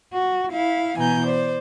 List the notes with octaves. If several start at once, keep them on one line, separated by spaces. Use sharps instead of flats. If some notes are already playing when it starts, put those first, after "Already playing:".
F#4
E4 F5
B2 E3 G#5 A#5 G6
C5 D5